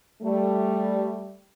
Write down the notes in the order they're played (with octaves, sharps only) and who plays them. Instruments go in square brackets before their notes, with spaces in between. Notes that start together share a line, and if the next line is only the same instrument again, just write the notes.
[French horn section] G3 A3